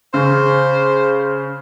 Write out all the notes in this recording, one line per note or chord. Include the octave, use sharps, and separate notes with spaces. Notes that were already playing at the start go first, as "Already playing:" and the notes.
C#3 C5